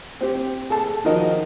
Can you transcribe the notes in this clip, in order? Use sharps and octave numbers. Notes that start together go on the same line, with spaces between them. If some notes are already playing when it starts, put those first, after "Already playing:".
C4 G4
G#4 A4 A5
D#3 F3 F#4 A#4 D#5